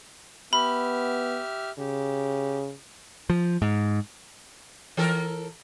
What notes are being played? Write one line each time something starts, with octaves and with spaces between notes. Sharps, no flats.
B3 G4 E5 B5 F6
C#3 G4
F3
G#2
E3 A4 A#4